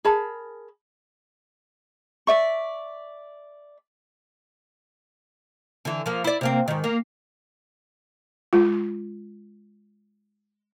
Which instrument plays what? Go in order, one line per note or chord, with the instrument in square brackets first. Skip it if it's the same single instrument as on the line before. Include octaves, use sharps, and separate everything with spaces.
[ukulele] G#4 A#4 A5 B5
[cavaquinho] D5 E5 C#6
[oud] D3 E3
F3 A#3
E4 D5
C3 A#3 C4
G#2 D#3
A#3
[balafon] G#3 F4